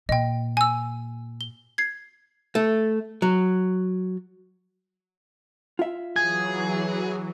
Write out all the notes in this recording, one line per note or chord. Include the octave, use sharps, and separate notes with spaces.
A#2 D#5 G5
G#5 E6
G7
G#6 C7
A3
F#3
F4 E5
E3 F#3 G#4 G#6